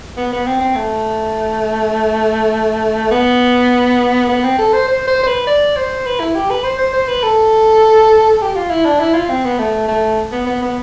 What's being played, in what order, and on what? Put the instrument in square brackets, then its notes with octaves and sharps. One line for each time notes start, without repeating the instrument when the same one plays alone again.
[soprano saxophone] B3
B3
C4
C4
A3
B3
B3
C4
A4
C5
C5
C5
C5
B4
D5
C5
B4
E4
G4
B4
C5
C5
C5
B4
A4
G4
F4
E4
D4
E4
F4
C4
B3
A3
A3
B3
B3
B3